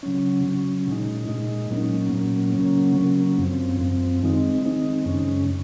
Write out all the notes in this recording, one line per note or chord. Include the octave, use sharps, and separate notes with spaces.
C#3 F#3 C#4
C#3 F#3 C#4
A#2 G#3 D#4
A#2 G#3 D#4
A#2 F#3 A#3 C#4
A#2 F#3 A#3 C#4
C#3 F#3 A#3 C#4
C#3 F#3 A#3 C#4
F#2 F3 C4
F#2 F3 C4
D#3 G#3 C4 D#4
D#3 G#3 C4 D#4
F#2 C#3 G#3 C#4